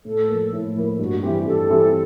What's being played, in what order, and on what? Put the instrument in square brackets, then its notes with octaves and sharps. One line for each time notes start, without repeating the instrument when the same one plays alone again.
[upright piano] A2 [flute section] A4
[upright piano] F3 A#3
[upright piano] A2 [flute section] E4
[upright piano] F3 A#3
[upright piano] G2 [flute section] F#4
[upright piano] E3 G3 C4 [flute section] G4
[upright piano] G2 [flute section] A4
[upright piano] E3 G3 C4